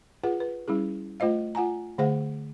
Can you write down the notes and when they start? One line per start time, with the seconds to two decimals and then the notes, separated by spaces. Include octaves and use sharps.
0.24 F4 G#4 B4 F#5
0.40 B4
0.68 G3 C#4 E4 G#4
1.20 A3 F4 C5 D#5 F5
1.55 F4 F#5 G#5 A#5
1.98 D3 A3 G#4 C5 F5 F#5